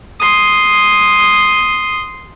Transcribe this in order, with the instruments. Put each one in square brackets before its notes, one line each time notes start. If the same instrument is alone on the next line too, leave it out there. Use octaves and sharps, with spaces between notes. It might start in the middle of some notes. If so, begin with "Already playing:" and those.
[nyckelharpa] C6 D#6